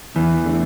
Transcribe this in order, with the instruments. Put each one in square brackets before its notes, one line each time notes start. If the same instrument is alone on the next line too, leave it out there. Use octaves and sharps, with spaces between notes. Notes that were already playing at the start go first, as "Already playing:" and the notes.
[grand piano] E2 [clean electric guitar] E3
[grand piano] D3 A3